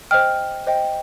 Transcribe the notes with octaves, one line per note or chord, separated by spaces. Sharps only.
C5 D#5 G5 F6
C5 D#5 G5